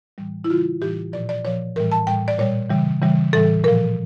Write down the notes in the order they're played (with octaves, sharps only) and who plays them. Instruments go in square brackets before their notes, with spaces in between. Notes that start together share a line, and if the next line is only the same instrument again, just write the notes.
[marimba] A2 E3 G3
E4
C#3 E3 G3 F4
A2 E3 G3 G4
A#2 F3 D5
D5
A#2 F3 C#5
A2 E3 G3 A#4
A5
A2 G3 G5
D5
A#2 G3 C#5
C#3 E3 G3
C#3 E3 G3
A2 E3 G3 A4
A#2 F3 A#4